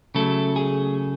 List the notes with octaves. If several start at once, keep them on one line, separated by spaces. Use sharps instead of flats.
C#3 F#3 A3 A4
G#4